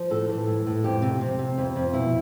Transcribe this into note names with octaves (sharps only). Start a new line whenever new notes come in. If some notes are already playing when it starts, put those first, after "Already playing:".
Already playing: F3
A2 A4
E3
A2
A2
F2 G4
C3
C3
C3
F2
F2
B2 E4